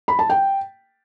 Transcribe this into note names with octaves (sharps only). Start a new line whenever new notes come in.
B5
A5
G5